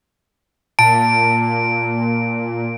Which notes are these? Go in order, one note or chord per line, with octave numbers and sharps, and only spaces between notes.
A#2 A5 D7